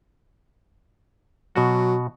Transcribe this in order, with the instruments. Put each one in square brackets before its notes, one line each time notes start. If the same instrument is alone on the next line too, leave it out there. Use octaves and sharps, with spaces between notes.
[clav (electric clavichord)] B2 F#4 [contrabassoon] F#3